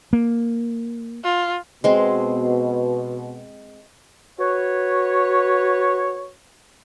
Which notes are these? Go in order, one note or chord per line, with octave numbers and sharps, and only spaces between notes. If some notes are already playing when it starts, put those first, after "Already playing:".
A#3
F4
B2 G#3 C4
F#4 B4 C#5